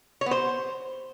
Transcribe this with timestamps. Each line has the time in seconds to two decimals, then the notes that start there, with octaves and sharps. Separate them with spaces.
0.21 C#5
0.26 B3
0.31 C5